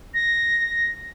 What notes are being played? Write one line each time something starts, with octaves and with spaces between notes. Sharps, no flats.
A#6